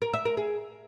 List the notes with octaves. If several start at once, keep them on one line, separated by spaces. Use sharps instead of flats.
A#4
E5
A#4
G#4